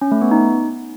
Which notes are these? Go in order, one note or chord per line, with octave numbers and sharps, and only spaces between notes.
C#4
A3
B3
D#4